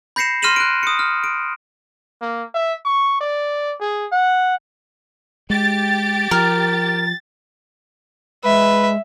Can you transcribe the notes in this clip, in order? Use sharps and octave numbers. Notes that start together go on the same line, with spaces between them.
B5 G6 A#6 C7 C#7 E7
C6 F6 A#6 D#7 E7 F#7
F#6 D7
D#6 C#7
F6
D7
A#3
E5
C#6
D5
G#4
F#5
G#3 G4 A6
F3 A#4
G#3 B4 E5